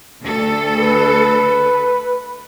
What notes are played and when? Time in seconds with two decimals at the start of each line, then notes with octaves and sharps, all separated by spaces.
0.23 D2 A4
0.78 B4